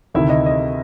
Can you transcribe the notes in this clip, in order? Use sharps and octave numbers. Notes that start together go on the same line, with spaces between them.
D2 C3 D#3 E4 E5
D#5
D#5